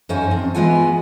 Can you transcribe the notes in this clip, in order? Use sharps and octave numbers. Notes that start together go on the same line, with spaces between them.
F#2 D#4 C5 C#5 F5 G#5
F3 C4
E3 G#3 B3 F4 F#5 G#5